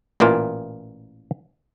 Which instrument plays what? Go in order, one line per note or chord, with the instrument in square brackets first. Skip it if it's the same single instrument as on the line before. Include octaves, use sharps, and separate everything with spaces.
[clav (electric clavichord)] A1 A#2 E3 A#3 F4